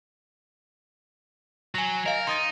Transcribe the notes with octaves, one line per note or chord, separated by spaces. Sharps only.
F#3 G#5 A#6
A#4 D#5 F5
D#4 C6 D#6 A6